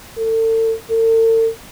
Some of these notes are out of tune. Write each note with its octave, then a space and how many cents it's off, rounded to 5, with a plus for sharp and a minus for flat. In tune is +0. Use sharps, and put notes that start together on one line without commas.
A4 +35
A4 +45